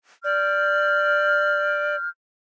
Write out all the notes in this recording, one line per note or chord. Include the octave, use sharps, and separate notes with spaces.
D5 F6 G6